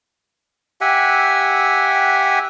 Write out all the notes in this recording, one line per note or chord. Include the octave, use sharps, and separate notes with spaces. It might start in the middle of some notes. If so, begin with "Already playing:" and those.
G4 E5 F#5 G#5